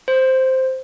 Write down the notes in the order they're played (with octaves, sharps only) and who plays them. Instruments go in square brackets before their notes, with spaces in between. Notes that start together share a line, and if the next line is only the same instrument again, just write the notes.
[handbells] C5